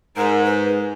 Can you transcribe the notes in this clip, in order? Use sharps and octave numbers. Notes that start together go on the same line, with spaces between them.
G#2 A#4
B4